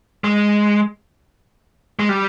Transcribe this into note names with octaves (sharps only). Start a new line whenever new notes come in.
G#3
G#3
G3